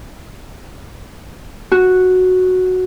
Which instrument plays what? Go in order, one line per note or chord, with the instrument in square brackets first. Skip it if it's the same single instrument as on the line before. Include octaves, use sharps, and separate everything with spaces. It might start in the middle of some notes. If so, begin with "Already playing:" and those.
[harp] F#4